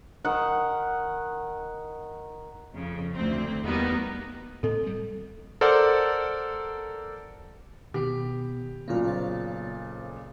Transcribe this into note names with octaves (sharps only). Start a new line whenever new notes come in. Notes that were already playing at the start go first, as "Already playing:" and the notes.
D#3 F#5
F2 C#3
D2 C4
E2 D#3 G3 A#3 B3 D#4
A2 C4 A4 D#5
D2 G2 G3
A4 A#4 C5 D5 F#5
B2 D#3 B3 G4
B1 A#2 C#3 A#3 F4
C5 C#5 A6